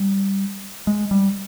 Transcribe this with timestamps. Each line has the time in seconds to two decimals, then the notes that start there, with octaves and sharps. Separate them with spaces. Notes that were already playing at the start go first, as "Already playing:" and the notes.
Already playing: G3
0.87 G#3
1.11 G3